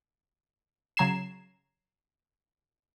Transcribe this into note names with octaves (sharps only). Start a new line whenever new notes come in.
C#3 F#3 A#5 G#6 C7 E7